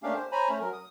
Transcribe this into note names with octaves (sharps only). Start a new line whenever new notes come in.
A3 A#3 C#4 D4 G4 F5
C5
C5 C#5 G#5 A#5 B5
A3 C#4
F#3 A#4
D#6